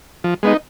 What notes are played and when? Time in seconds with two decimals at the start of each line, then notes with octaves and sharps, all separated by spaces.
0.24 F3
0.43 G#3 B3 D#4